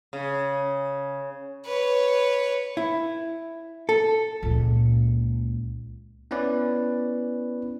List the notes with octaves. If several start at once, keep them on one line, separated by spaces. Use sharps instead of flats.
C#3
B4 C#5
E4
A4
C#2 A#2
B3 C#4 E4 B4 D5